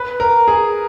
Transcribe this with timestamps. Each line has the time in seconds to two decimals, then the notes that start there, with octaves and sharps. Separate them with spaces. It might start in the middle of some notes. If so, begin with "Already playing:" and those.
Already playing: B4
0.20 A#4
0.48 G#4